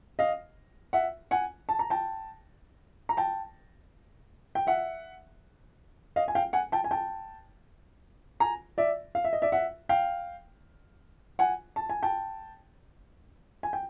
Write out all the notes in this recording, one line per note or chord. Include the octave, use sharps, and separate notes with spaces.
D#5 F5
E5 F#5
F#5 G#5
A5
A#5
G5 A5
A#5
G5 A5
G5
E5 F#5
D#5 F5
G#5
F5 G5
F#5 G#5
G5 A5
G#5
G5 A5
G#5 A#5
D5 E5
F5
E5
D#5
D5 E5
E5 F#5
F5 G5
F#5 G#5
A5
G#5
G5 A5
G#5
G5